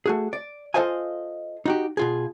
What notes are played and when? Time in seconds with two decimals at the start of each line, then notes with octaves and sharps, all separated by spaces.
0.06 A3 F#4 G#4
0.33 D5
0.74 F4 A4 C5 D#5 F5 G#5
1.66 D#4 F#4 G4
1.97 B2 F4 G#4